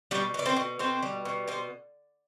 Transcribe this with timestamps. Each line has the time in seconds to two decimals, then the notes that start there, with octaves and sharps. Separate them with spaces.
0.11 B2 G3 G4
0.34 B2 D5
0.46 C4 C5
0.57 B2
0.79 B2 C4 C5
1.03 G3
1.25 B2
1.48 B2 C5